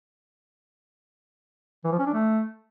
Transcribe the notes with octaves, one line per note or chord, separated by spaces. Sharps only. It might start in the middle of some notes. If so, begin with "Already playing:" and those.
E3
F3
C#4
D4
A3